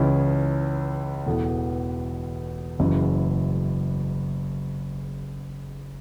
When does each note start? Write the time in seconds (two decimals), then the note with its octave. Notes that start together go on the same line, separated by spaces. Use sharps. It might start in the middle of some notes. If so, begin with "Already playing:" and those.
Already playing: C#2 C#3 E3 C#4 E4
1.26 E1 E2 E3 B3 A4
2.79 F#1 F#2 C#3 E3